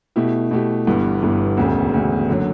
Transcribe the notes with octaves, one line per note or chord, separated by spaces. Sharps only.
B2 A3 E4 G4
B2 A3 E4 G4
G1 G2 E3 B3
G1 G2 E3 B3
E1 D2 C#3
E1 D2 C#3
F#1 D3 F#3